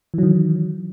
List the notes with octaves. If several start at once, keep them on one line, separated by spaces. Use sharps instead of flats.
D#3 E3 F#3